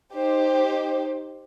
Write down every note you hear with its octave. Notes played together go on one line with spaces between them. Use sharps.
D#4 G4 C5